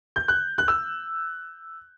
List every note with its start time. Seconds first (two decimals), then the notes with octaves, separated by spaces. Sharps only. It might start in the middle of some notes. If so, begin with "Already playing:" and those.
0.16 G6
0.28 F#6
0.58 F#6
0.68 E6